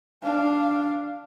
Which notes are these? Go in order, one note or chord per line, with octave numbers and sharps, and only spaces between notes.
D4 F5